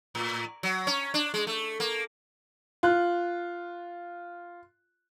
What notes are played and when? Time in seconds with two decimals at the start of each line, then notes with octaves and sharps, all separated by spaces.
0.15 A2
0.63 F#3
0.87 C#4
1.14 D4
1.34 G#3
1.47 A3
1.80 A#3
2.83 F4 F#6